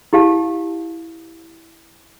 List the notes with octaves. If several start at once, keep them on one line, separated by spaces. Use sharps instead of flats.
E4 G4 F5 A5